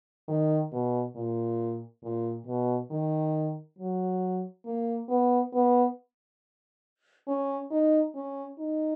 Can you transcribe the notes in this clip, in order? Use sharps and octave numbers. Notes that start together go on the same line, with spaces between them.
D#3
B2
A#2
A#2
B2
D#3
F#3
A#3
B3
B3
C#4
D#4
C#4
D#4